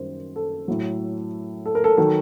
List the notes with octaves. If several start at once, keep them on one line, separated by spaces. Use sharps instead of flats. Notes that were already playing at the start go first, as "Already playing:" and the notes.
Already playing: F#2 D#3 G3 C5
A4
A2 F#3
A4
A#4
A4
D#3 F#3 A4